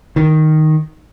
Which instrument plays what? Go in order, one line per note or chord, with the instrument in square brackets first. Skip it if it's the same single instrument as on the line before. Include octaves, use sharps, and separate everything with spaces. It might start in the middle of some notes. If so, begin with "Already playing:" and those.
[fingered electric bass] D#3